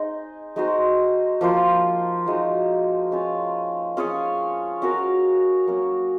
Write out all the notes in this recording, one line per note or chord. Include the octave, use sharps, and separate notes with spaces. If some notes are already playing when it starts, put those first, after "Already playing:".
Already playing: D#4 G#4 C5 D#5
G#3 D#4 F#4 C5
F3 A#3 F4 C5
F3 G#3 D#4 F#4
G#3 C#4 F4
C#4 F4 G#4 C#5
C#4 F#4 A#4 F5
F#3 A#3 C#4